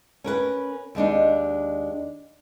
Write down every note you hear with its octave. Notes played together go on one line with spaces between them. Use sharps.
C#4 A#4 B4
D#2 G#3 D4 D#4